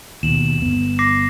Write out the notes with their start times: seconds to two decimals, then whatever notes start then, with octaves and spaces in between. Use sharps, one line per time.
0.23 D#2 B2 E7 F#7
0.62 G1 B3
0.99 D6 A#6 C7